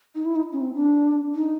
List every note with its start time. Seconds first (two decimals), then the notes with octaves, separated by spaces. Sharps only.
0.15 D#4
0.25 E4
0.36 D#4
0.53 C#4
0.61 C4
0.75 D4
1.35 D#4